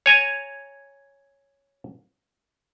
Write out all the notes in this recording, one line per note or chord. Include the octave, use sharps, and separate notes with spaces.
C#5 G#5 A#5